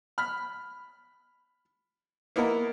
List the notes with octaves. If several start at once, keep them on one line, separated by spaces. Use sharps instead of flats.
B5 F6
A#3 B3 D#4 E4 A#4